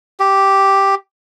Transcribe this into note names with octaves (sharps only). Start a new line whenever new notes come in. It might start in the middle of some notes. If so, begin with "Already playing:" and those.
G4